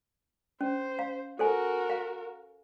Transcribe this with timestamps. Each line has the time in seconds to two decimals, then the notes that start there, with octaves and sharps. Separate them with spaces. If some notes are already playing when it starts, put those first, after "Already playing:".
0.61 C#4 C5
0.99 F5
1.39 F#4 A4 A#4 C5 G#5
1.90 F5